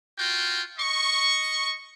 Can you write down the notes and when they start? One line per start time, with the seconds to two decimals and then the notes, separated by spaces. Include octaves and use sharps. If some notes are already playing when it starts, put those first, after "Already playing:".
0.18 F4 F#4 G5
0.79 D#5 C#6